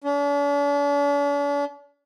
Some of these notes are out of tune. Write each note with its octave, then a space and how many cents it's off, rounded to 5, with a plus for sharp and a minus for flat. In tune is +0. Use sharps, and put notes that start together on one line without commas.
D4 -45